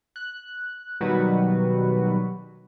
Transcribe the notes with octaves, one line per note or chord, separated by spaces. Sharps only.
F#6
B2 D#3 F#3 G3 F#4 B4